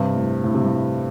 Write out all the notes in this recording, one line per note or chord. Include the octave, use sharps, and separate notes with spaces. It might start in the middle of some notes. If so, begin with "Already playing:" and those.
Already playing: G2 C3
A2
A2
C3
A2